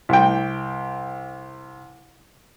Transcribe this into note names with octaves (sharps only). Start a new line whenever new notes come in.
C2 G5